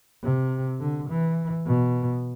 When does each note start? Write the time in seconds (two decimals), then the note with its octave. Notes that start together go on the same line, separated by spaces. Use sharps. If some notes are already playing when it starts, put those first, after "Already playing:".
0.22 C3
0.80 D3
1.09 E3
1.66 B2